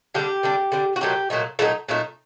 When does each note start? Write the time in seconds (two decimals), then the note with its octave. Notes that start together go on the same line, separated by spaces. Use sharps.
0.14 D3 G3 D4 G4
0.43 D3 G3 D4
0.72 D3 G3 D4
0.96 F#4
1.01 A#2 F#3 A3 D#4 G4
1.30 A#2 F#3 A3 D#4
1.59 A#2 F#3 A3 D#4 A4
1.89 A#2 F#3 A3 D#4